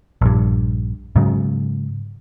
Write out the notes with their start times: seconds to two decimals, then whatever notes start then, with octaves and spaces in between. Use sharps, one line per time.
0.22 A#1 G2
1.16 G#2 C#3 F#3